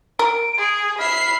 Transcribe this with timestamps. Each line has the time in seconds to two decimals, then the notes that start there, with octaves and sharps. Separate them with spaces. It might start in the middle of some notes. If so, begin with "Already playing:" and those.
0.19 A#4 D7
0.58 G#4
0.99 E5 B5 F6 C7